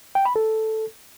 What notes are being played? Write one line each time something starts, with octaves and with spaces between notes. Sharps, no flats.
G5
B5
A4